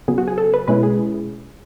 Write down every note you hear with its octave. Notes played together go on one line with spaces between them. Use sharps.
C#3 F#3 B3 G#4
F#4
G#4
A4
B4
B2 G#3 C#4 E4 B4
G#4